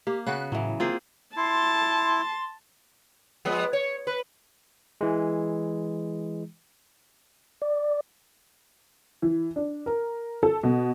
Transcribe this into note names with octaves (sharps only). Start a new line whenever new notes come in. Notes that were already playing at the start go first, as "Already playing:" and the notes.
A#3 G4
C#3 B3 F#4 F#6
A2 E3 F#3
A#3 C4 F4 G#4
E4 A5 C6
F3 G#3 B3
C#5
B4
E3 G#3
D5
E3
D4
A#4
A4
B2